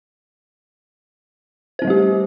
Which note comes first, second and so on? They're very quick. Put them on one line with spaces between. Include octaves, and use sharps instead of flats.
C5 C4 G3 A3 G4